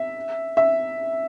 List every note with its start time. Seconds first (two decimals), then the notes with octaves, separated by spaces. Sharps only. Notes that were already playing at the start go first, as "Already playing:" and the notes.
Already playing: E5
0.57 E5